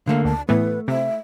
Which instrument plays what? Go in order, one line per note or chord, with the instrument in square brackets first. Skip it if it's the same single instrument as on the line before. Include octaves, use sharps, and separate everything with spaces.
[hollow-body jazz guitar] D3 A3 A#3 [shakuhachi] F5
[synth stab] D2 [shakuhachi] A5
[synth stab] A2 E3 B3 [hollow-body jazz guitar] A3 [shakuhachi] B4
[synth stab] C3 [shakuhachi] E5